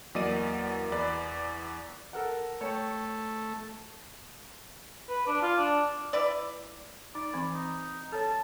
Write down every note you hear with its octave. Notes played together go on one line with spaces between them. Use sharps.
E2 F#3 A#3 D5 D#5 D#7
E2 B4 D5 D6
A4 A#4 F#5
A3 C#5 G5
B4
D4
F4
D4
E4 B4 D5
D#4 D5
E3 C4 B5
D#4
A4 C#5 A5